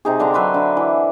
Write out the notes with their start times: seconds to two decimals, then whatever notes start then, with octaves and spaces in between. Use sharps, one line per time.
0.05 C3 D#4 G#4
0.20 D3 D4 A5 A#5
0.34 F#3 B4 E5 C6
0.54 D3
0.77 E3